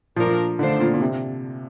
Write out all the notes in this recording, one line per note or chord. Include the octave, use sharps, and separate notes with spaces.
A#2 F3 A3 D4 F4 A#4
D3 D#3 A3 D4 F4 C5
A#2
A#2
C3